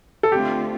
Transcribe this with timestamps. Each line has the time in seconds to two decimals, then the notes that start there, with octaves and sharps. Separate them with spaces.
0.23 A4
0.32 D3 A3 C4 F4 G4